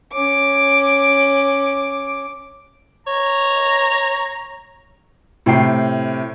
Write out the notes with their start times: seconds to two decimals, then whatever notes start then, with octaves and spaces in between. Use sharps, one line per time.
0.12 C#4 D6
3.07 C#5 A#5
5.46 A2 C3 G5 C7